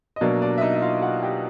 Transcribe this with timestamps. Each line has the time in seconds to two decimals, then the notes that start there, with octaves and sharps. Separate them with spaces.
0.16 D#5
0.21 B2 F#3 A#3 D4 D5
0.42 D4 D5
0.58 E5
0.61 D#4 D#5
0.74 E5
0.82 F4 F5
1.02 F#4 F#5
1.22 G4 G5